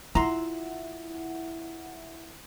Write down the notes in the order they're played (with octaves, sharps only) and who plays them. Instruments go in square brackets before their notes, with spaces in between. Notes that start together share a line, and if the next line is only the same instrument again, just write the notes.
[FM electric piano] E4 E5 F#5 [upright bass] F4 [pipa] A#5 C6